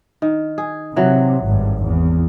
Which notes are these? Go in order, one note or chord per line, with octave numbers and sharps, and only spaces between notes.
D#3
G#4
C3 E3 F#3
G#1 G2
E2